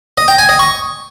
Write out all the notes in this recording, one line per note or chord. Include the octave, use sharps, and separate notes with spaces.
D#5
G5
G#5
D#5
C#6